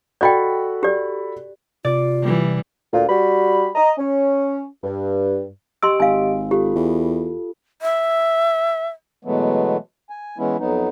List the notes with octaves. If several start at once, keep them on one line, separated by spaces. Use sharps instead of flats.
F#4 A4 D5 D#5 G5 B5
G4 D5
C3 F4 D5
E3 G3
D2 A#2 F4
G3 F#4 B5
D#5 A#5
C#4
G2
G4 D#5 C6 E6 D7
G#1 F5 G#5
F4 G4 A4
E2
E5
B2 E3 F#3 G#3 A3 B3
G#5
E3 G#3 B3 C#4 E4
F2 F#3 B3 D#4